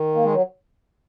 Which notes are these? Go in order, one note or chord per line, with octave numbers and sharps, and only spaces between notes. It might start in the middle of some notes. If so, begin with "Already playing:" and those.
Already playing: D#3
A#3
G#3
F#3